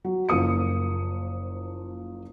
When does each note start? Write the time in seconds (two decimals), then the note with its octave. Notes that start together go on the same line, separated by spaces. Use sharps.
0.04 F#3
0.29 F#1 F3 A#3 D#6 C#7